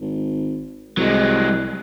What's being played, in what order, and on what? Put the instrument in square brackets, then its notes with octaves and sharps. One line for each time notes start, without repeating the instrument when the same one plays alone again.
[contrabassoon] G#1
[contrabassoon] C2 [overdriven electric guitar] F#3 G#3